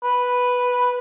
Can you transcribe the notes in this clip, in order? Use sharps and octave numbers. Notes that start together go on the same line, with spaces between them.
B4